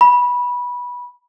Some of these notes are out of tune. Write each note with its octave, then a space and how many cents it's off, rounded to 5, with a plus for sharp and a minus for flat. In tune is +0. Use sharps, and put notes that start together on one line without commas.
B5 -15